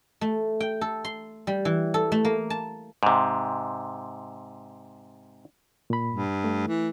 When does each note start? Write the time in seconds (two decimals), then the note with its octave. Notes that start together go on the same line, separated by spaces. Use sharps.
0.21 A3
0.60 G5
0.81 A4
1.05 C6
1.47 G3
1.65 E3
1.94 A4
2.12 A3
2.25 A#3
2.50 A5
3.03 G#2 C3
5.90 A#2 B5
6.11 G2
6.44 A3
6.67 E3